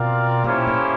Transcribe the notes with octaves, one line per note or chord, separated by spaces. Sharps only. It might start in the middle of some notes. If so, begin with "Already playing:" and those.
Already playing: B2 C4 F4 A#4 D5 F5
A#2 A#3 C#4 E4 G4 C5
A2